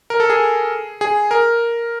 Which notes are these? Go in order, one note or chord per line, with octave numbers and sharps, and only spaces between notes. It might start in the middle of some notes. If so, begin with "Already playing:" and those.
A#4
A4
G#4
G#4
A#4